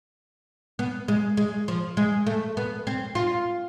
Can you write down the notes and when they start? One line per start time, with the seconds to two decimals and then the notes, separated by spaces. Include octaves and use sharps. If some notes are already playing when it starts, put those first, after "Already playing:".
0.79 B3
1.08 G#3
1.37 G#3
1.68 F3
1.97 G#3
2.27 A3
2.57 B3
2.87 C4
3.15 F4